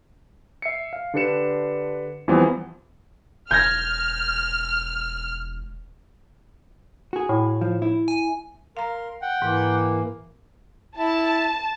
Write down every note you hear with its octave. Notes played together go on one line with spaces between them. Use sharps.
E5 C7 C#7
F5
D3 D4 G4 B4 C#7 E7
E2 E3 F3 G3 B3 C4
E1 F6 G6 G#6 A#6
F#4 G#4
A2
F3
E4
G#5
A#4 F5 A#5 C6
F#5 G5
G#2 E3 A#3
E4 A5